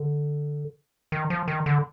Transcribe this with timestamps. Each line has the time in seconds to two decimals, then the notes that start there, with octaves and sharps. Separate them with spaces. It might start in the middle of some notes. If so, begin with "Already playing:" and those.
Already playing: D3
1.12 D#3
1.30 F3
1.48 D#3
1.66 D3